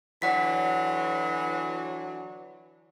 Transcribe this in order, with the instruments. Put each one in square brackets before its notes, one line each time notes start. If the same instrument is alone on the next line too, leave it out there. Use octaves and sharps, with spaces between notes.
[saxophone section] D3 E3 F#3 [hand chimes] D5 F#5 B6